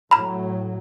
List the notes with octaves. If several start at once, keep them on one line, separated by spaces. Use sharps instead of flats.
A2 F#3 A#5 B5